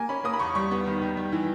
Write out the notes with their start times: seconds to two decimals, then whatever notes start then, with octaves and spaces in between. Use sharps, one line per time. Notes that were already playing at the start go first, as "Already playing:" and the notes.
Already playing: A#3 G#5
0.09 C#4 B5
0.24 A#3 D#6
0.33 B5
0.39 E2 C#6
0.55 G3 C#6
0.71 B3
0.86 D#3
1.02 D#3
1.17 G3
1.32 E3